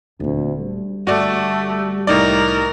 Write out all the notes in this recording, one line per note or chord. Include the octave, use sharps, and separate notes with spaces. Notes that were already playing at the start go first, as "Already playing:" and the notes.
D#1 D2 C4
G3
G1 A3 F#4 D5
C2 A2 D#4 A#4 D5